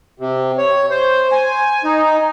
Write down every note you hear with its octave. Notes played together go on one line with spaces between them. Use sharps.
C3
C#5
C5
G#5
D#4